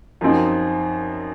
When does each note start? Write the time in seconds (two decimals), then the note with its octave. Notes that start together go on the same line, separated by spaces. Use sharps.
0.21 F#2 F3 C4 D#4